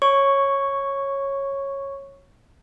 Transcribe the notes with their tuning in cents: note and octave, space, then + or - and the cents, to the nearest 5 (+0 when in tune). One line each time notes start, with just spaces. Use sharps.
C#5 -10 C#6 +0